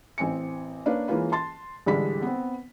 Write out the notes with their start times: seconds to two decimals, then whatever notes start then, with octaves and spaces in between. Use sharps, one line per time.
0.18 A1 C4 G#5 C#7
0.86 A#3 D4 B4 C#5 F5
1.08 E3 G#3 A#3 C#4 F4 B4
1.32 A5 C6 A6
1.86 A1 D3 G3 G#3 B5 B6
2.22 B3 C4